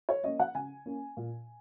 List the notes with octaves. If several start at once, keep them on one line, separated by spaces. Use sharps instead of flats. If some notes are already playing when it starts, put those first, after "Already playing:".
C#5
A#3 C#4 D#5
F#5
C#3 G#5
A#3 C#4
A#2